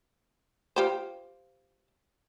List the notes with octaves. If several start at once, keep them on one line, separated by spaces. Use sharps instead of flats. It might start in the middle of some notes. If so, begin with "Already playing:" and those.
F4 G4 C5